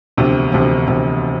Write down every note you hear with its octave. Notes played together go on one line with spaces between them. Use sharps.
E1 D2 C3 F3
E1 D2 C3 F3
E1 D2 C3 F3